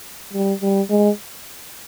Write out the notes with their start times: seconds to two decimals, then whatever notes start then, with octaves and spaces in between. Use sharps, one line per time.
0.33 G3
0.62 G3
0.90 G#3